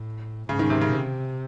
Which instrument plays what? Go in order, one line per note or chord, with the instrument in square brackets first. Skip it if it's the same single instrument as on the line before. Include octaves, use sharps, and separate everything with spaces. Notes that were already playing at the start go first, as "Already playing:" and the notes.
Already playing: [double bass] A2
[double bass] G#2 [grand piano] C#3
[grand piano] D#3
C3
C#3
[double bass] C3